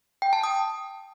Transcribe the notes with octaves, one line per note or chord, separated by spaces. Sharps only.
G5
A5
D#6